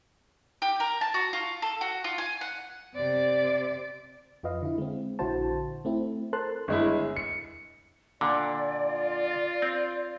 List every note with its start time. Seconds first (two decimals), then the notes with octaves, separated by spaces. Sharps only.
0.62 G4
0.80 A#4
1.01 A5
1.14 F#4
1.33 F4
1.62 A4
1.81 F#4
2.04 F4
2.18 G#5
2.41 F#5
2.95 C3 D5
4.43 F2 F4 B4 D#5 F5
4.62 D3 E4
4.78 G#3 C4
5.19 A#1 D3 E4 F#4 C5 A5
5.85 A3 C4 E4
6.33 A4 A#4 C5 A5 C6 F#6
6.68 G1 G#3 E4
7.16 C#7
8.21 A#2 D3 D5
8.86 F4
9.62 C4